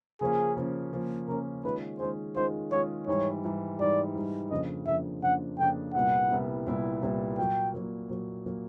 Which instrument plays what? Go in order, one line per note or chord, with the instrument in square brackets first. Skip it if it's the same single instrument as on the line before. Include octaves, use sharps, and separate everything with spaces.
[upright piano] C#3 F3 A#3 C#4 [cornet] G#4
[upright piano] C#3 F3 A#3 C#4
C#3 F3 A#3 C#4
[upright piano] C#3 F3 A#3 C#4 [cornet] A#4
[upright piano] D#3 G#3 C#4 F4 G#4 [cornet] B4
[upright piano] D#3 G#3 C#4 F4 G#4 [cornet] C5
[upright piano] D#3 G#3 C#4 F4 G#4 [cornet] C5
[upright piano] D#3 G#3 C#4 F4 G#4 [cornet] C#5
[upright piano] G#2 E3 G3 [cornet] C#5
[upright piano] G#2 E3 G3
[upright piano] G#2 E3 G3 [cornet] D5
[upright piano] G#2 E3 G3
[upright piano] F2 C#3 F3 A#3 D4 [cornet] D#5
[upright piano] F2 C#3 F3 A#3 D4 [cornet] E5
[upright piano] F2 C#3 F3 A#3 D4 [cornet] F#5
[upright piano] F2 C#3 F3 A#3 D4 [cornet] G5
[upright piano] C2 A#2 G3 B3 E4 [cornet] F#5
[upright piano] C2 A#2 G3 B3 E4
C2 A#2 G3 B3 E4
C2 A#2 G3 B3 E4
[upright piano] A#2 F#3 A#3 [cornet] G5
[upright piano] A#2 F#3 A#3
A#2 F#3 A#3
A#2 F#3 A#3